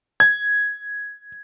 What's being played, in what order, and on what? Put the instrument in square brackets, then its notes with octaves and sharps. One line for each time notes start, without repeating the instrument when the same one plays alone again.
[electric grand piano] G#6